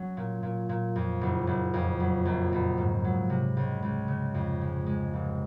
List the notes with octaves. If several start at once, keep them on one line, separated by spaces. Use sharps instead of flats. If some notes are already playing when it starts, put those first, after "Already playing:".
Already playing: F#3 C#4
A#2
A#2
A#2
F2
F#1
F#1
F2
F#3
A#1
A#1
G#2
F#3
C3
C#2
C#2
C#3
F2
G#3
G#3
F1